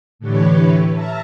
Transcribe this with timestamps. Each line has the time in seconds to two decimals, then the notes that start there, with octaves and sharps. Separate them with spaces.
0.19 A2 D3 E3 G4 B4 C#5
0.91 E5 A5 A#5 F6